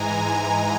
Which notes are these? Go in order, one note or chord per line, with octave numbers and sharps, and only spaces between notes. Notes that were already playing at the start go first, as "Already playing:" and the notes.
Already playing: G#2 E3 G#3 G#5 A#5